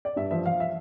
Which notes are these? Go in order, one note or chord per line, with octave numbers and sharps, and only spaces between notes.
D5
G2 E5
F3 E5
F3 F5
E5